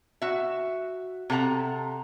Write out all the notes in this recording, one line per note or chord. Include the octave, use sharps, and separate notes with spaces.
F#4 E5
C3 A4 F#5 A#5